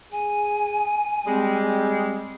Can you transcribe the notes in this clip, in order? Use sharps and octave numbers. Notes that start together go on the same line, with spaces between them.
G#4 G#5
G3 G#3 C4